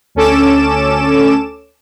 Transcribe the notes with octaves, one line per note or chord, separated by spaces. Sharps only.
D2 C#4 A4 D6 E7